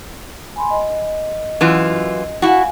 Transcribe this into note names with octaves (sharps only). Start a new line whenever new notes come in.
G#5 B5 C6
D#5
F#2 E3 F4
E4 F#4 F5 G#5